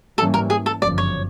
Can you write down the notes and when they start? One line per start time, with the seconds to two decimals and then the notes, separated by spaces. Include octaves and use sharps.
0.18 G#2 E3 G3 A#3 C#4 A4
0.34 A#4
0.50 G#4
0.66 A4
0.81 G1 F#2 C#3 F3 D5
0.98 C#5